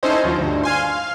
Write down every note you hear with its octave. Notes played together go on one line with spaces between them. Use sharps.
C#4 D#4 E4 A4 C5 D#5
D#2 F3 F#3
D2 G2
F5 G#5 C6
F5